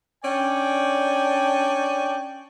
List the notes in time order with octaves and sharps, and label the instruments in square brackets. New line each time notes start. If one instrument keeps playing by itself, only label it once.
[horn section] C#4 D4 D5 G5